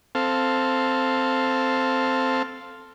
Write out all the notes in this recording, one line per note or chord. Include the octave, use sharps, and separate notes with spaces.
C4 A4 F5